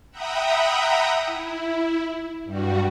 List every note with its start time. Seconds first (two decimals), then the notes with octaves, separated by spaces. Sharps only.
0.11 E5 F#5 G5 A#5 B5 D#6
1.26 E4
2.45 G2 G3 F#4